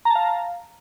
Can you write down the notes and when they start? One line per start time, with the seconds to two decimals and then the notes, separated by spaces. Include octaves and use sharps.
0.05 A#5
0.10 A5
0.15 F5